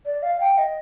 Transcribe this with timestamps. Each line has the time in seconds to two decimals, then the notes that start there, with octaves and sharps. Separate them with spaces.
0.06 D5
0.23 F5
0.40 G5
0.58 D#5